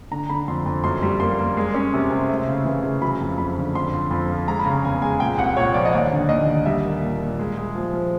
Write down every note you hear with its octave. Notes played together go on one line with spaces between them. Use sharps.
D3 A#5
D3 B5
F2 C6
F2
F#2 C6
G3
A#3 C6
A#3
G#3
C#4
C3
C3
A3
C#3
E3
C#3
F#3 B5
F2
F2 B5
D3
F2 C6
F2
F2 B5
F3
G#3 A#5
B5
C#3 A#5
E2 G#5
G#3 G#5
A#2 G5
C2 F#5
A#2 C#5
F3 D5
D#5
D#2 D5
D3
D#2 D#5
D#2
G3 E5
A#3
A#2
A#2
G#3
G#3
F3
F3